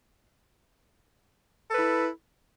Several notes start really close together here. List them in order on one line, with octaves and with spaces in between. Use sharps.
A4 B4 E4